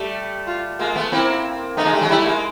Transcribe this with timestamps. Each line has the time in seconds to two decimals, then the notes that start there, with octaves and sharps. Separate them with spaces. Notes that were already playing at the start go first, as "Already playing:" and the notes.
Already playing: G3 A3
0.47 F4
0.79 G#3 A#3 F4
0.96 A3 B3
1.12 A#3 C4 E4
1.77 A3 B3 D#4
1.85 G#3 A#3
1.93 G3 A3
2.01 F#3 G#3
2.09 G3 A3 E4
2.26 G#3 A#3